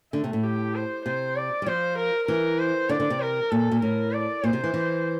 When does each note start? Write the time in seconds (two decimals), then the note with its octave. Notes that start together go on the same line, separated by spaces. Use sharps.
0.13 D3 A3
0.24 C3
0.33 A2
0.44 G4
0.75 C5
1.05 C3 C5
1.36 D5
1.62 G3
1.66 F3 C5
1.98 A#4
2.28 E3 A#4
2.59 C5
2.89 D3 D5
3.00 D3
3.10 C3
3.21 A#4
3.51 A#2 A4
3.71 A#2
3.82 A2 A#4
4.12 D5
4.43 A#2 C5
4.53 C3
4.64 E3
4.74 E3